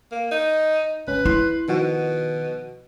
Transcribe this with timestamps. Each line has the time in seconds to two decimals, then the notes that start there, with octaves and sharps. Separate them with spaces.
0.11 A#3
0.31 D#4
1.07 G1 C#2 C#4 B4
1.25 E4 C6 F#6
1.68 B2 D#3 F3 F#4